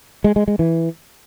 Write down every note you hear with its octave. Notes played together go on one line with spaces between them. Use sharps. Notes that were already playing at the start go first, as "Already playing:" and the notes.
G#3
G#3
G#3
E3